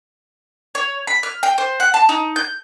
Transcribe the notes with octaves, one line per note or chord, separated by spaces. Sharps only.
C#5
B5
F6
G5
C5
F#5
A5
D#4
G6